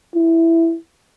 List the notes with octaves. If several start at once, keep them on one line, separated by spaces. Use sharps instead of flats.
E4